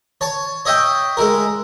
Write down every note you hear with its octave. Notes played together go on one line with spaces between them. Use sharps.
C#5 A5
C#5 D#5 E5 G5
G#3 E4 A#4